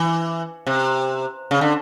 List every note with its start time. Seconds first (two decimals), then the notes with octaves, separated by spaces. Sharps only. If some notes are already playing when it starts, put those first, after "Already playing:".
Already playing: E3
0.67 C3
1.51 C#3
1.61 D3